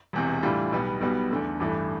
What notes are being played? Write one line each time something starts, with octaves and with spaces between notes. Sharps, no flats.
E1 E2 C3
A2 E3 G3 D4 F4
B1 B2 G3 B3
B1 B2 G3 B3
E2 D3 A3
A1 G2 E3 A3